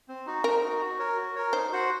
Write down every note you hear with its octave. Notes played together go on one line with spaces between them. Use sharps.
C4
D#4 F#4
C4 A#4
D#4 F#4
F#4
A#4 C#5
F#4
A#4 C#5
D#4 C5
F#4 C5 F#5